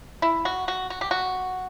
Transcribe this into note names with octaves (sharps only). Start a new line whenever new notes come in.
E4
F#4
F#4
F#4
G4
F#4